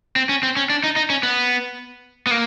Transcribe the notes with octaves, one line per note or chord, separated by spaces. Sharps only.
C4
C#4
C4
C#4
D4
D#4
D#4
C#4
B3
B3
A#3